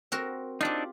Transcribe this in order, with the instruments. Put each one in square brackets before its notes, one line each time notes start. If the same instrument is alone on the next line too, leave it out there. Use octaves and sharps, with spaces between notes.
[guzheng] C4 F#4 A#4
[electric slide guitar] C4 D4 D#4 [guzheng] F4 G4